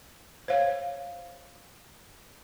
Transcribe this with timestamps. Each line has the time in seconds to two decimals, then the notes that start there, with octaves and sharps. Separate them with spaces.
0.48 C5 C#5 F5